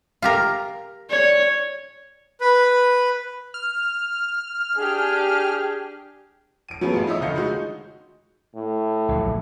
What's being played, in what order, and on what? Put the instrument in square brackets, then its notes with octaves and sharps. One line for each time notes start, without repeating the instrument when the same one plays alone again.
[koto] F4 G4 A#4
[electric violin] C#5 [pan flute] D5
[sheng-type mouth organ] B4 B5
[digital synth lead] F6
[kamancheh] D4 G4 [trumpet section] G#4
[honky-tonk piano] D7 D#7
F#3 A3 B3 C#4 G#4
A1 F4
D#4 E4 C#5 D#5 E5 D#6
F1 D3 D#3 F5 G6 C#7
G#3 D#4 F#4
[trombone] A2
[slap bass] A#1 D3 F#3